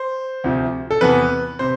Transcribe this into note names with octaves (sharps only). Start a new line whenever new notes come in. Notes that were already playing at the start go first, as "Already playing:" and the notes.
Already playing: C5
D2 C3 F3
A4
E2 C3 E3 B3 B4
C3 C5